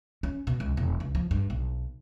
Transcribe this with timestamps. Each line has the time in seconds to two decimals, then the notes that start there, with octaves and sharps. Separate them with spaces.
0.23 C#4
0.47 B2
0.60 C#2
0.77 E1
1.00 C#2
1.15 F3
1.31 G2
1.50 B1